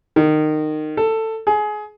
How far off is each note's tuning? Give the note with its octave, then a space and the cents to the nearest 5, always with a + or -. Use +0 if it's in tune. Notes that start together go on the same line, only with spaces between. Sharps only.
D#3 -20
A4 +15
G#4 +25